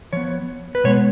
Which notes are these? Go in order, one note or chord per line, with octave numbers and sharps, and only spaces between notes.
F3 B3 C#5
B4
B2 G#3 B3 C#5